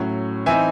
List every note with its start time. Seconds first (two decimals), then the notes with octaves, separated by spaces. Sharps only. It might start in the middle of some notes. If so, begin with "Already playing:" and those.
Already playing: A2 F#3 C#4
0.46 E3 C4 D#4 E5 G#5